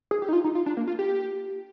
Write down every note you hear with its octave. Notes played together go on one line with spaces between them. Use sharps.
G#4
G4
D#4
F4
D#4
F4
D4
A#3
F4
G4